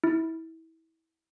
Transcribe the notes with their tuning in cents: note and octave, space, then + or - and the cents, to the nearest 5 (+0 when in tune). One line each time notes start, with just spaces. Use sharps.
E4 -25